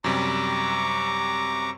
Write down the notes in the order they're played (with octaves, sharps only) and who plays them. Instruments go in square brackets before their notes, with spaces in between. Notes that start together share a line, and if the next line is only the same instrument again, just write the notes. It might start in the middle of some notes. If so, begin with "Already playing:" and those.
[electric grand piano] F#2 C3 G3 [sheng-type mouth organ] A#5 C#6 D6